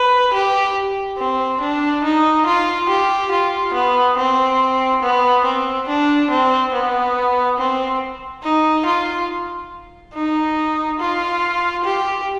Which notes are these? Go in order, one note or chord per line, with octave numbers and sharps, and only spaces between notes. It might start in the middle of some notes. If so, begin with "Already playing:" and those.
Already playing: B4
G4
C4
D4
D#4
F4
G4
F4
B3
C4
B3
C4
D4
C4
B3
C4
D#4
F4
D#4
F4
G4